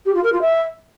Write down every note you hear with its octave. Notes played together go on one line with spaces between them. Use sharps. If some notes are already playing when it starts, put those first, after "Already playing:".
G4
F4
A#4
F4
E5